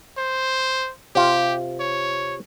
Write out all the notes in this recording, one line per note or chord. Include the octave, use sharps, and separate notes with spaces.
C5
C3 F4 G4
C#5